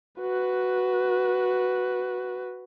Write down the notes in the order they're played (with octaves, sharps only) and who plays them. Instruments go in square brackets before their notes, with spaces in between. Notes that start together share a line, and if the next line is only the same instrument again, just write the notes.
[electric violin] F#4 B4